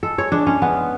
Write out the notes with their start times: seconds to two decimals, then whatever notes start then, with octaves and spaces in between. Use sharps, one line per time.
0.03 G#3 A4
0.18 G#3 C#5
0.32 G#3 D4
0.47 G#3 C#4
0.62 G#3 B3